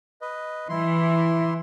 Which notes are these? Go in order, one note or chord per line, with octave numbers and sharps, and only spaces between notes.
B4 D#5
E3 E4 C6